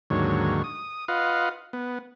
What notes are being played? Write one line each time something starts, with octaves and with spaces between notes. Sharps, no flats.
D#2 G#2 D3 F#3 C#5
D#6
F4 B4 D#5 F5 F#5
B3